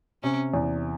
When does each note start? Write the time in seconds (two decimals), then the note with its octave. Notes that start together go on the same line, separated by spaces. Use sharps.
0.23 C3 C#4
0.54 E2